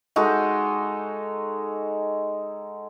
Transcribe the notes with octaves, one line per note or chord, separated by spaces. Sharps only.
G#3 D#4 F#4 A4